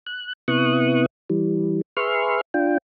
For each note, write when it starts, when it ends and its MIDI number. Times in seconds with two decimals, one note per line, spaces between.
0.07 0.33 90
0.48 1.06 48
0.48 1.06 59
0.48 1.06 64
0.48 1.06 85
0.48 1.06 87
0.48 1.06 90
1.30 1.81 52
1.30 1.81 55
1.97 2.41 68
1.97 2.41 71
1.97 2.41 76
1.97 2.41 84
1.97 2.41 85
1.97 2.41 89
2.54 2.78 62
2.54 2.78 65
2.54 2.78 79